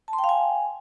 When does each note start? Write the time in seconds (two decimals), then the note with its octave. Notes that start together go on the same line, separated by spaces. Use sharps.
0.08 A5
0.13 C6
0.18 G5
0.24 F5
0.29 G#5